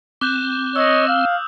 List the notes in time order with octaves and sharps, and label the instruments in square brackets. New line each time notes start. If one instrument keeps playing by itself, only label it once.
[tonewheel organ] C4 [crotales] D6 F#6 G6
[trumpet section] C#5 D#5 [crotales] D#6 E6
[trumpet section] F5